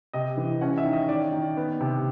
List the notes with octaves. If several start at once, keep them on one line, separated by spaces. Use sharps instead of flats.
C3 D#5
E3
C#4 F#5
E5
D#3
D#5
D#3 D5
D#3
B3
C3